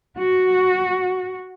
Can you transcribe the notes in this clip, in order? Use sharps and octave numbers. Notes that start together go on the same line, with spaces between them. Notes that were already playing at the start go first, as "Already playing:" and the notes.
F#4